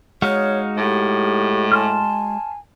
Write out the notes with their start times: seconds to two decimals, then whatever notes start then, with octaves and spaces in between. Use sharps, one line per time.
0.22 G#3 D#4 F#4 C#5 F5
0.77 A2 G4
1.72 G#5 A5 C6 F6